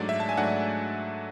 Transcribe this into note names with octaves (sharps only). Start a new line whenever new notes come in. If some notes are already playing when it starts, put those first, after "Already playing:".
Already playing: G#2 F#3 A3 D4 D5
E5
A5
G#5
G#2 F#3 A3 D4 F#5